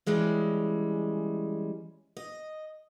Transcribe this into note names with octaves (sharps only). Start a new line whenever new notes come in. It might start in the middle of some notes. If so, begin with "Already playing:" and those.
E3 G3 G#3 C#4
D#5